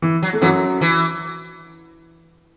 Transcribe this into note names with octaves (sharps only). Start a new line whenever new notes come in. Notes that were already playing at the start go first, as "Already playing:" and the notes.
E3
F#3
A3
F#2 E3 F#3
E3